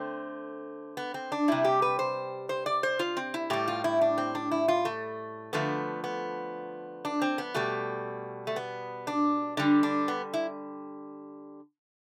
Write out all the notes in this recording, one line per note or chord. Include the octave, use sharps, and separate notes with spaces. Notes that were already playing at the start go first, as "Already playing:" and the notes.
Already playing: D3 A3 C4
B3
C4
D4
C3 G3 E4
G4
B4
C5
C5
D5
C5
F4
C4
E4
A2 G3 G4
F4
E4
D4
C4
D4
E4
F4
A3
D3 F3 A3 B3
B3
D4
C4
B3
B2 G3 A3
A3
B3
D4
D3 G3 D4
D4
B3
E4